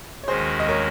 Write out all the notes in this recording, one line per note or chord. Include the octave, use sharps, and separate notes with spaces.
C#5
D#2 D#3 G#3 C#4 F#4 G#4 C5
D#5
A#4 C#5